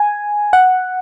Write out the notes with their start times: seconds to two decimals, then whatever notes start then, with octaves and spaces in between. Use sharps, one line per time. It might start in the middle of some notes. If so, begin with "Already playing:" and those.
Already playing: G#5
0.53 F#5